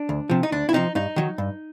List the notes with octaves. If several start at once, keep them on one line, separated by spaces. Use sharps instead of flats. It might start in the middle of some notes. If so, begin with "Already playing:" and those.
Already playing: D4
D2
C3 F3
D#4
D2 D4
E4
C3 F3 D#4
G2 D#4
D#3 F#3
G2